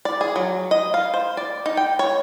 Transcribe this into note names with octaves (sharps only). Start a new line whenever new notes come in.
D5
G#4
F#3
D#5
F5
C5
D5
D#4
G5
C#5